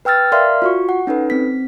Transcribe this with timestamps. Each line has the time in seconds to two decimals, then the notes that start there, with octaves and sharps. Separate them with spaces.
0.05 B4 G5 E6 F6 A6
0.32 A#4 D5 E5 F5 C6 F6
0.62 F4 F#4 C#6
0.89 F#5
1.07 C#4 D#4 A4 B4
1.30 C4 B6